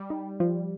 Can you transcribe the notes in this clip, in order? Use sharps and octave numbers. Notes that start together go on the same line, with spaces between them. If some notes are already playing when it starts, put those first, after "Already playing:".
Already playing: G3
D#4
F3